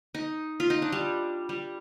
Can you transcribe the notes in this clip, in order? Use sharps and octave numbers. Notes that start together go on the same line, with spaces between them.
D#4
F4
D#4
D4
G3
G3